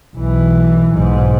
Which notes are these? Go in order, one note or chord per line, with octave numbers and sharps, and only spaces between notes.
B1 E3
B1 G#2